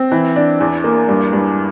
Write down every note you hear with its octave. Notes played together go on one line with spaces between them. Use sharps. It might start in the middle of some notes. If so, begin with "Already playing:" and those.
Already playing: C4
E3
D4
E2
A#3
G2
G2